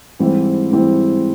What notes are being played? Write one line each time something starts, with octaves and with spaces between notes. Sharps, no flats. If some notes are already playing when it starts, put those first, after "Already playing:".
G#2 E3 G3 C4 E4
G#2 E3 G3 C4 E4